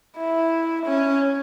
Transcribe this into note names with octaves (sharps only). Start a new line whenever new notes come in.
E4
C#4